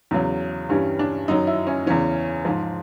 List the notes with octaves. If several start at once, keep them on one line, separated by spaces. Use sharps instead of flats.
E2 C#3 F#3
G2 E3 G3 C#4
D4
F#2 D#3 F#3 D#4
E4
C#4
E2 C#3 E3 C#4
G#2 F3